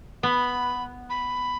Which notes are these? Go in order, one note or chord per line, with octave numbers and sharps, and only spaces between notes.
B3 B5
B5